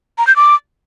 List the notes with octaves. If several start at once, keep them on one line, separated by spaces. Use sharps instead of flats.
A#5
G6
D6